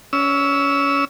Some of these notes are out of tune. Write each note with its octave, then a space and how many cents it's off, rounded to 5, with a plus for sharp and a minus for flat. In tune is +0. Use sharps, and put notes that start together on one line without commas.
C#4 +20 E6 -10